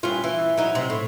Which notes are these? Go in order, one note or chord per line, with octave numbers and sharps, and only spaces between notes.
G2 C#4 F4
E3
F#3 D#4
C3
A2